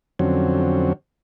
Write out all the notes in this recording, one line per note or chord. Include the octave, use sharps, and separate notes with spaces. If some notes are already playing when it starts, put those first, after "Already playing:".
F2 D3 F#3 C4 C#4